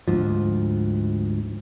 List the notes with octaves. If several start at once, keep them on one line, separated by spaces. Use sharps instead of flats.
D2 G#2 F3